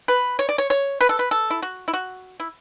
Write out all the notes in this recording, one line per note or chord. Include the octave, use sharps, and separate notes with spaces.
B4
C#5
D5
C#5
C#5
B4
A4
B4
A4
E4
F#4
E4
F#4
E4